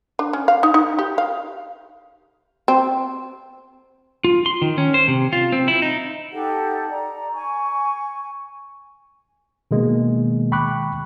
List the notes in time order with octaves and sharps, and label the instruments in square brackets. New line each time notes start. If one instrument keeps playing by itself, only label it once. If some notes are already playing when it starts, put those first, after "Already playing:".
[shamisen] D4
C#4
F5
D#4
D#4
G4
F5
C4
[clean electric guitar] F4
C6
D#3
C#4
C5
C3
F4
C4
E4
D#4
[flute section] D#4 G4 A4 F#5
D5 A#5
G#5 C#6
[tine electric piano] B2 D#3 G#3 A#3 B3
G5 B5 C#6 D6 F#6